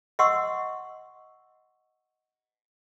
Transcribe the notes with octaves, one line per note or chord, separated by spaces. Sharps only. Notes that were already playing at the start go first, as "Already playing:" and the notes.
D#5 F#5 C6 C#6 E6